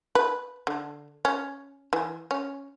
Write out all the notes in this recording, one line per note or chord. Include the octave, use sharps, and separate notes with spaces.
B4
D3
C#4
E3
C#4